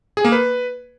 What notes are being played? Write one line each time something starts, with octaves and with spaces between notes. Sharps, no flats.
G#4
A#3
B4